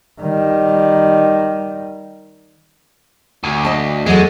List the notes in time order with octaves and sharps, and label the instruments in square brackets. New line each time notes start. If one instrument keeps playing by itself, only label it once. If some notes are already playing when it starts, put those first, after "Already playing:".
[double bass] D#3 G3
[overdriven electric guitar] D2
[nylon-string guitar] D#5 A5
[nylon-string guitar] E2 F#3 A3 [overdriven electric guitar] G#3